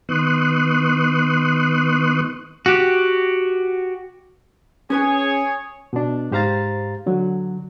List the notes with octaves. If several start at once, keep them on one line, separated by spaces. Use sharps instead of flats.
D#3 B3 C6 C#6 D#6 F#6
F#4 G4
C#4 G#4 B4 C#5 G#5
B2 D4
G#2 G4 C5 F5 A#5 A6
D3 F#3